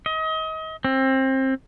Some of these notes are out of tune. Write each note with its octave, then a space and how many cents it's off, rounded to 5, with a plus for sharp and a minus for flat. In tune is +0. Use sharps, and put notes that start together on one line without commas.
D#5 +35
C4 +25